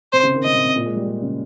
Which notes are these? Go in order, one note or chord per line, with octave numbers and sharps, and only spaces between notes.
C3 C5
C#3
D#3
C#3 D#5
C3
C3
A#2
G#3
G3
G3
C#3